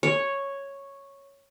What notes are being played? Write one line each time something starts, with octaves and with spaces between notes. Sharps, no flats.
C#5